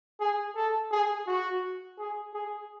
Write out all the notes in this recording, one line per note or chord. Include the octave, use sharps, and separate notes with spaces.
G#4
A4
G#4
F#4
G#4
G#4